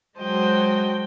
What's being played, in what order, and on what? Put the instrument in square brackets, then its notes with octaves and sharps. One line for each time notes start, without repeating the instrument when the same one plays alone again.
[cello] F#3 G#3 [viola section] F#4 G5 [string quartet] C5 D#5 A5